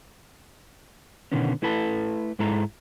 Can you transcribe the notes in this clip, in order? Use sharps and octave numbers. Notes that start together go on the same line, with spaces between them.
B2 D3 D#3 B3 C#4
A3 E4 A4 B4 G5 A5
G#2 G#3 E4 A4 A#5